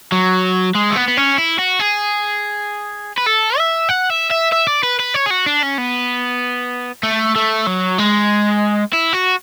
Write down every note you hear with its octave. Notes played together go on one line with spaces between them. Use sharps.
F#3
G#3
A3
B3
B3
C#4
E4
F#4
G#4
B4
A4
E5
F#5
E5
E5
E5
D5
B4
B4
C#5
G#4
F#4
D4
C#4
B3
A3
A3
F#3
G#3
E4
F#4